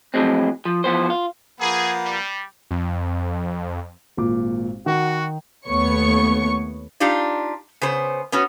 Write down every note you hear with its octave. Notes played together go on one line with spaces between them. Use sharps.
F2 A2 D#3 F#3 G#3 C4
F3
E3 F3 B3 C5
F4
F3 A#3 G#4 B4 F#5
G3
F2
G#1 A#2 D6
D#3 F#4
D#2 A3 B3 C#5 C#6
D4 D#4 F4 G4 D5
C#3 B3 C5
B3 C#4 F#4